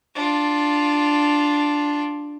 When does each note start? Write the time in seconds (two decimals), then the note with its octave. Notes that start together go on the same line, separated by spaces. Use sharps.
0.15 D4 F4